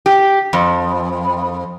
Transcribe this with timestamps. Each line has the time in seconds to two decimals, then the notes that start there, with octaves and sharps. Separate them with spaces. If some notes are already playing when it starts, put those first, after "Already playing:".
0.06 G4
0.53 F2